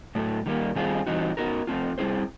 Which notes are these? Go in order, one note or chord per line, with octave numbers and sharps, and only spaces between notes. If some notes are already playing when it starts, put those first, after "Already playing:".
A2 F#3 A3
D#3 G3 A#3
D#3 G3 C4 F4 G#4
E3 G3 C4 D#4 F#4
B3 D#4 F#4 A#4
F3 A3 C4 F4
G3 C4 E4 G#4 C5